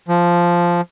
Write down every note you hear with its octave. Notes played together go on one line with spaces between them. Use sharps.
F3